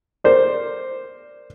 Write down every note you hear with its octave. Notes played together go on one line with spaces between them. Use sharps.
A#4 C5 D5